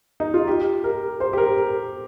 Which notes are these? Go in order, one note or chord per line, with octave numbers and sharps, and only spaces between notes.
D#4
F4
G4
A#4
C5
G4
A#4